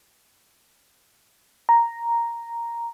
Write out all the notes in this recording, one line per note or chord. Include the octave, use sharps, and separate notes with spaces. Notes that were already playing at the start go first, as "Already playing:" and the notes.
A#5